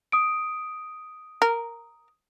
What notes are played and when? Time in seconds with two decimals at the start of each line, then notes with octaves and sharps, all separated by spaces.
0.12 D#6 D7
1.42 A#4